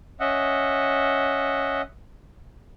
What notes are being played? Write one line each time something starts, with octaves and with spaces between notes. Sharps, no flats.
C#4 D#5 E5 F#5